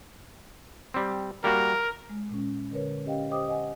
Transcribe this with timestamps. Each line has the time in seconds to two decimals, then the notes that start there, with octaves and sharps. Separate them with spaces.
0.94 G3 C4
1.44 G3 A#3 F#4 A#4
2.09 G#3
2.29 A#2 G#3 C#4
2.72 D3 A#4 B4 C#5
3.05 C#4 G4 D#5 F5 G5
3.31 G4 C5 D#5 G5 D6 D#6
3.48 D#5 F#5 G#5